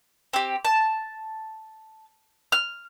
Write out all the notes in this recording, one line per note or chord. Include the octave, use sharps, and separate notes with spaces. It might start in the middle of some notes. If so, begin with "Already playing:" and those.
C4 G4
A5
F6